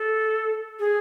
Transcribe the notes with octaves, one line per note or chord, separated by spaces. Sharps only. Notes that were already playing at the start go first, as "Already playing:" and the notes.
Already playing: A4
G#4